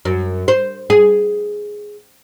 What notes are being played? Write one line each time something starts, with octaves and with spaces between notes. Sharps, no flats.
F#2
C5
G#4